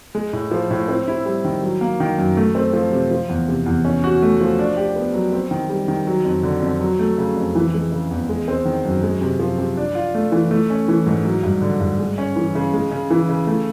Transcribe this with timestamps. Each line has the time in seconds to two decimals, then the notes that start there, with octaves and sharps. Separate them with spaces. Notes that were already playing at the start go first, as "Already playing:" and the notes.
0.15 G#3
0.33 A2
0.51 F3
0.71 A2
0.88 C4
1.08 E4
1.26 G3
1.45 D#3
1.63 F#3
1.81 A#3
2.00 D#3
2.18 F#2
2.37 A3
2.55 C4
2.73 F3
2.92 C3
3.11 F3
3.29 E2
3.48 C3
3.66 E2
3.85 C#4
4.04 F#4
4.22 A3
4.41 F3
4.59 D4
4.77 G4
4.96 B3
5.14 F#3
5.33 C4
5.51 D#3
5.70 G3
5.88 D#3
6.07 F#3
6.25 F2
6.43 D3
6.62 F2
6.81 F#3
6.99 A3
7.18 C#3
7.36 F2
7.55 E3
7.74 G#3
7.92 C#3
8.11 E2
8.29 G#3
8.48 C4
8.65 D#3
8.85 F#2
9.03 G#3
9.21 C3
9.39 F3
9.58 C3
9.77 D4
9.95 F4
10.15 A3
10.32 E3
10.51 A3
10.70 C#4
10.88 E3
11.06 G#2
11.25 F#3
11.43 G2
11.62 D3
11.80 G2
11.99 G#3
12.18 C#4
12.36 E3
12.55 C#3
12.74 G#3
12.91 C#3
13.11 E3
13.29 C#3
13.47 A3